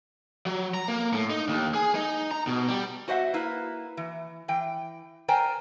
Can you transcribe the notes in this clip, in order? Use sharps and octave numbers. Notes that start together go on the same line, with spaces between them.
F#3
A#5
A#3
A2
D#4
D#2
G#4
D#4
A#5
B2
G3
F#4 C5 D#5 E5 F#5
A#3 E4 B4
E3
E3 G5
A#4 C5 D5 G5 G#5 A#5